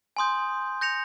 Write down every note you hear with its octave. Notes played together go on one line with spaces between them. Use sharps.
G#5 C6 D#6 G6
G6 A#6 C#7 F7